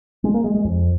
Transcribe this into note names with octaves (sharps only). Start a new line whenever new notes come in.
G#3
A#3
G#3
G#3
F2